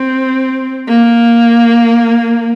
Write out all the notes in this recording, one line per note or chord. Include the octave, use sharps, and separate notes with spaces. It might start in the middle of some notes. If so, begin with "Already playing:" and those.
Already playing: C4
A#3